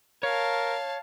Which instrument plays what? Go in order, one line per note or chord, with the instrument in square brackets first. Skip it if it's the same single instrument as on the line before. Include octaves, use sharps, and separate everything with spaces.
[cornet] A#4 [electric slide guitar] C#5 [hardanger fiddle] F5 A5